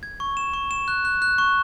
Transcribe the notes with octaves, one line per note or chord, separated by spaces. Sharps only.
G#6
C#6
E7
C#6
E7
F#6
F#6
F#6
C#6